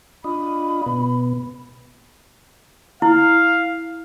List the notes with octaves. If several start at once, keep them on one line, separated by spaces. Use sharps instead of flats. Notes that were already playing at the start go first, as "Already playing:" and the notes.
D4 F4 D#5 B5
B2 B3
E4 F5